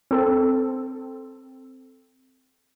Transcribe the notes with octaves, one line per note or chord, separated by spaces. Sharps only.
C4 A4